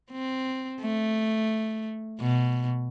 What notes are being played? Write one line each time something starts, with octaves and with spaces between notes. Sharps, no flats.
C4
A3
B2